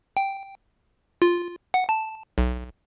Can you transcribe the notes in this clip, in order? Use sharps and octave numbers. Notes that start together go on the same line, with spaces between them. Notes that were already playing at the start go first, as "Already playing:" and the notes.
G5
F4
F#5
A5
B1